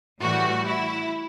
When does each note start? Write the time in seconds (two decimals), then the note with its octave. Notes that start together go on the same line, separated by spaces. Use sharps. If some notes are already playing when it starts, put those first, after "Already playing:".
0.21 A2 E3 G3 F#4
0.64 E4